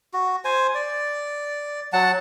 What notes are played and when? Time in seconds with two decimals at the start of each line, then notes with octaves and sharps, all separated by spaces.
0.13 F#4
0.45 C5 G#5
0.75 D5
1.93 F#3 F#5 A5